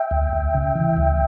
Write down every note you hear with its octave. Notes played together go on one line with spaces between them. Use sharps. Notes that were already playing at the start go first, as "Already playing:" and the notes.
Already playing: E5 G5
D2
D2
C#3
E3
D2